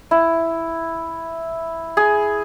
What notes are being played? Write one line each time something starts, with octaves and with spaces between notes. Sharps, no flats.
E4
G#4